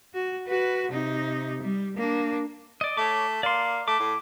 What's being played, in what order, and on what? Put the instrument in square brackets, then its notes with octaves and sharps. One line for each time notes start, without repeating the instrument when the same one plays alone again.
[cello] F#4
F#4 B4
C3 D#4
G3
A#3 D4
[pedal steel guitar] D5 D#5
[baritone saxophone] A3 [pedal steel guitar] C#5 D6
[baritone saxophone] A#3 [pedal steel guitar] D5 C6
[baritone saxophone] A3 [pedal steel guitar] D6
[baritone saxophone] A2